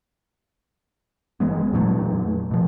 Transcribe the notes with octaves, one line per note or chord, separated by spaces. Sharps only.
G1 E3 G#3 B3
F2 A#2 F#3 A3
B2 F3